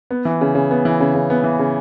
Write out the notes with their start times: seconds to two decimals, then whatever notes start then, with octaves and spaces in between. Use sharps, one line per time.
0.11 B3
0.25 E3
0.41 C#3
0.55 C#3
0.71 B3
0.85 E3
1.00 C#3
1.15 C#3
1.30 B3
1.44 E3
1.59 C#3